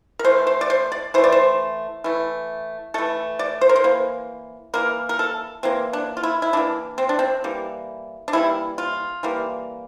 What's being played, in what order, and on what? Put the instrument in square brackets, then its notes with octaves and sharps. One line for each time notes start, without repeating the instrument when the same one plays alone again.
[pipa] A#4
E3 A3 C5
C5
D5
C5
D5
E3 A3 C5
D5
C5
E3 A3
E3 A3 A4
D5
C5
A#4
C5
E3 A#3
E3 A#3 A#4
A#4
A4
E3 A#3 C4
D4
F4
E4
E4
E3 A#3 D4
C4
D4
C4
E3 G3 A#3
D4
E3 G3 A#3 E4
F4
E3 G3 A#3